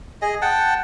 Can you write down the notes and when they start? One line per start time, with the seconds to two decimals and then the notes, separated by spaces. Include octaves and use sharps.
0.22 G#4 D#5
0.42 F#5 G5 A5